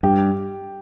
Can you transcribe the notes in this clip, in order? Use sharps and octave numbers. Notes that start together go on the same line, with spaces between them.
G2 G4